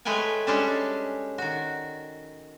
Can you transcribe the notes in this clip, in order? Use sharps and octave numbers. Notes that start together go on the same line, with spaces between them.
G#3 A3 B4 C#5 G5 G#5
G3 G#3 C#4 D4 G4 A4
D#3 F#4